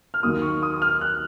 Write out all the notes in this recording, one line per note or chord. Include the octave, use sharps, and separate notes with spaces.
F6
D#2 D#3 F#3 A#3 D#6
C#6
D#6
D#6
F6
F#6